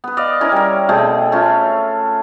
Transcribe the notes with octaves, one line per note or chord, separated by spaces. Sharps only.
B3 B4
D5 D#5 F5
C#4 E4 A#4
G3 A#4
B2 A3 C4 G#4
A3 C#4 F4